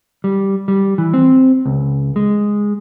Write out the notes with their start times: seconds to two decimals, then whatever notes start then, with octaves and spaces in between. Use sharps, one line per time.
0.24 G3
0.68 G3
0.98 E3
1.13 C4
1.66 C#2
2.16 G#3